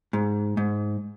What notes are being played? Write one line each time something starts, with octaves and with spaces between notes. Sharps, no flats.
G#2
G#2